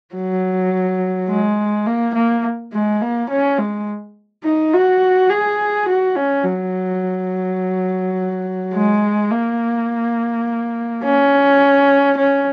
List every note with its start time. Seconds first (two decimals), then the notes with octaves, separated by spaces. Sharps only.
0.15 F#3
1.29 G#3
1.86 A#3
2.15 A#3
2.73 G#3
3.02 A#3
3.29 C#4
3.58 G#3
4.44 D#4
4.73 F#4
5.30 G#4
5.88 F#4
6.15 C#4
6.44 F#3
8.74 G#3
9.30 A#3
11.03 C#4
12.17 C#4